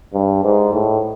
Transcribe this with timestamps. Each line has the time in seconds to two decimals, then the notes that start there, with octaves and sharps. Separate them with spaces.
0.14 G2
0.44 G#2
0.73 A2